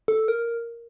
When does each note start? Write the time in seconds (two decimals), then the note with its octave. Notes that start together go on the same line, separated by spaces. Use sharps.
0.08 A4
0.28 A#4